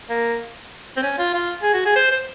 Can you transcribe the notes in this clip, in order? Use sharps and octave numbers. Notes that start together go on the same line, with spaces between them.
A#3
C4
C#4
F4
F4
G#4
F#4
G#4
C5
C5